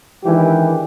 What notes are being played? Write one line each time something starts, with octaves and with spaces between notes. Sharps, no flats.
D#3 E3 G#3 D4 G4